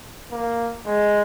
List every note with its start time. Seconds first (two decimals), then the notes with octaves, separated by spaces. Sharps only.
0.32 A#3
0.86 G#3